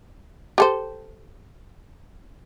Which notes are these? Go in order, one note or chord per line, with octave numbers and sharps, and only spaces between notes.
G4 A4 C5